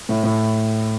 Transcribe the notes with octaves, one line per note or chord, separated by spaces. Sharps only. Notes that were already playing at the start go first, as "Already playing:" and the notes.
A2
A2